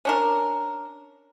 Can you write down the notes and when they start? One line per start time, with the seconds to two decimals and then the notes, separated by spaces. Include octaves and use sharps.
0.05 C#4 D4 A#4